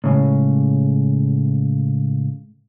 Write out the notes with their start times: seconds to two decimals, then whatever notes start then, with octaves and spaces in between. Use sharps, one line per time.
0.04 A2 C#3 G#3